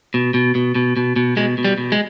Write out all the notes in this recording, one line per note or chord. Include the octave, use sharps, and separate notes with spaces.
B2
B2
B2
B2
B2
B2
B2 G#3
B2
G3
B2
G#3